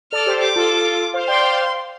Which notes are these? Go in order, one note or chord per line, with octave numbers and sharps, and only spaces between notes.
A4 D5 F6
G4 C5
G4 C5 D6
F4 A4
F4
F4
F4
C5 F5
D5 G5 C6
C5 F5